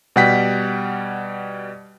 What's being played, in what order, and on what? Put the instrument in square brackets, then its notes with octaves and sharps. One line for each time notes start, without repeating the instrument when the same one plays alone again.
[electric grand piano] B2 G3 F#5 G5 B6